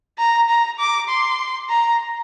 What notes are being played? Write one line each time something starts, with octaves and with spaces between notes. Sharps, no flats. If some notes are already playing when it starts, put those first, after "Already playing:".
A#5
A#5
D6
C6
A#5